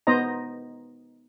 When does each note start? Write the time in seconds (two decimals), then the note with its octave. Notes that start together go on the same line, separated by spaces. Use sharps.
0.07 B3 D#4 C5 D#5 A#5